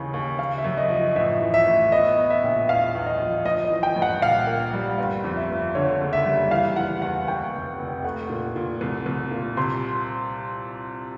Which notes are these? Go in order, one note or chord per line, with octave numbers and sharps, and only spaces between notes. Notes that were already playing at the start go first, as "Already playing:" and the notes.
Already playing: D#2 C#3 E3
D#2
C#3 F5
E5
F#2
D#5
F3
D#5
A1 E5
E3
E5
A2
B3 D#5
B3
E5
A#1
E2 F5
E2
D#5
F3
G1 D#5
D#5
E3
G5
G2
F#5
A#1 F5
A#3
G3
G1 F5
F2
E5
G1
D3 C#5
F#1
E5
G3
E3 F5
E3 F#5
E2 F#5
D#2 G5
F1
F1
A3 F#5
A#2
A#2
C2
C2
A#2
C3 C6